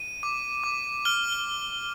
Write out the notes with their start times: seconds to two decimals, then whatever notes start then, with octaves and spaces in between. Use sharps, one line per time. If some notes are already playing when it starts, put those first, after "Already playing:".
Already playing: D#7
0.23 D6
0.64 D6
1.05 F6 G7
1.32 G7